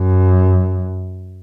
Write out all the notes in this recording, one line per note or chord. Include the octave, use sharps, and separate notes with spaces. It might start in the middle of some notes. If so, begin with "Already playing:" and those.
Already playing: F#2